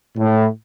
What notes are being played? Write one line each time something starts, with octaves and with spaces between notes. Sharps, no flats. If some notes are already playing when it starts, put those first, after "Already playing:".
A2